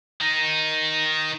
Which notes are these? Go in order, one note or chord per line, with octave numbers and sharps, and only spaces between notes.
D#3 D#4